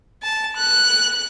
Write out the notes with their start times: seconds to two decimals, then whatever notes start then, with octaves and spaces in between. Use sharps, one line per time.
0.23 A5
0.57 F#6